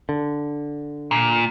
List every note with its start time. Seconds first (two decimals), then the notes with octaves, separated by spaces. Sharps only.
0.09 D3
1.11 A#2